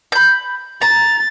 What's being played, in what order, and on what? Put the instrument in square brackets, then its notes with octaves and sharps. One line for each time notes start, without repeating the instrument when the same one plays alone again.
[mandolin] B5 G6
[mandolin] A#5 [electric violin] A6